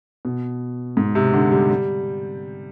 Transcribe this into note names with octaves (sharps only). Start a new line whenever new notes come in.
B2
G#2
C3
D3
G3
G3